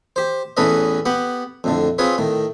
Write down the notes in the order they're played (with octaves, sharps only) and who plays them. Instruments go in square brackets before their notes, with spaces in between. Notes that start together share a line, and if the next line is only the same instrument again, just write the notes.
[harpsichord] G4 C5
E2 A2 C#4 A4 B4 D#5
B3 G4 F#5
F2 A2 D3
C4 F4 G#4 B4 C#5
A2 D#3